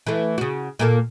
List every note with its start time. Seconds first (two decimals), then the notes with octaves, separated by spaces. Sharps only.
0.07 E3 A3
0.38 C#3 F#4
0.79 A#2 A#3 A4